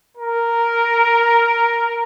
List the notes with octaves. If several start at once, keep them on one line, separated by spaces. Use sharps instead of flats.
A#4